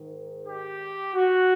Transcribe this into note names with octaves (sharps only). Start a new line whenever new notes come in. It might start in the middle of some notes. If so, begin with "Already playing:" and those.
Already playing: G#2 D#3
G4
F#4